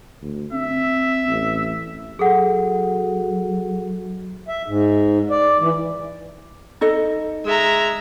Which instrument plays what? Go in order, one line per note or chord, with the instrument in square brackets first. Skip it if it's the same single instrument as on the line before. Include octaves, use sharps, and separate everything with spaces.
[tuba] D2
[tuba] C4 [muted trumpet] E5
[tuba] A1
[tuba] F#3 [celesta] G#4 A4 F#5
[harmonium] E5
G#2
D5
E3
[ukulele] D#4 A4 D#5
[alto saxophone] G#3 [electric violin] E5 A#5